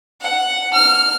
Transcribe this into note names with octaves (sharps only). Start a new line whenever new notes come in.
F#5
F6